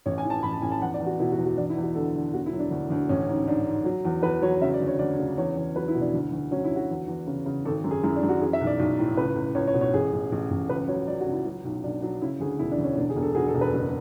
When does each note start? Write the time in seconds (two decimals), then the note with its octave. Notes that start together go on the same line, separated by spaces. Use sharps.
0.06 A1 C#5
0.18 G#5
0.24 E3
0.30 A5
0.43 A1 B5
0.53 A5
0.62 A1 G#5
0.72 A5
0.81 E2 F#5
0.94 D5
1.00 E2
1.06 F#4
1.19 B2 E4
1.32 F#4
1.38 E2
1.45 F#4
1.57 E2 D4
1.70 E4
1.77 E2
1.83 F#4
1.95 D3 A4
2.14 D3
2.33 E1 F#4
2.46 E4
2.52 F#3
2.59 D4
2.71 D2
2.90 D2
3.09 A1 C#4
3.29 G#2
3.47 G#2 D4
3.67 G#2
3.85 F#3
4.05 E2
4.23 E2 B4
4.42 F#3 C#5
4.61 C#3 E5
4.74 D5
4.81 D2
4.87 C#5
4.99 D2 D5
5.19 C#3
5.37 E2 C#5
5.57 E2
5.75 F#3 B4
5.88 E4
5.95 B2
6.01 D4
6.14 D2
6.32 D2
6.51 F#3 C#4
6.64 E4
6.70 D2
6.76 F#4
6.90 E2
7.08 E2
7.27 C#3
7.46 C#3
7.65 G#1 A4
7.84 F#2
7.91 G#4
8.03 F#2 E4
8.16 D4
8.23 F#2
8.29 F#4
8.41 E3 G#4
8.53 E5
8.61 B1
8.67 D5
8.79 B1
8.99 A2
9.17 C#2 B4
9.36 C#2
9.55 C#2 C#5
9.67 C#5
9.74 B2
9.81 C#5
9.93 A1 G#4
10.13 A1
10.32 A1
10.51 A1
10.69 C#2 B4
10.88 F#3 C#5
11.08 F#3 D5
11.21 F#4
11.26 C#2
11.32 E4
11.46 F#3
11.65 B1
11.83 B1 D4
12.02 F#3 D4
12.22 C#3 E4
12.40 D2 G#4
12.59 E1 E4
12.72 D4
12.78 D2
12.84 C#4
12.97 E1 D4
13.10 G#4
13.16 E1
13.22 A4
13.35 B2 G#4
13.48 A4
13.54 E1
13.61 B4
13.73 F#1